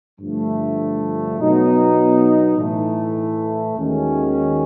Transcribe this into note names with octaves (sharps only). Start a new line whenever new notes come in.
G2 D3 F3 A3
B2 F#3 B3 D#4
A2 E3 A3
D#2 D#3 G#3 C#4 F#4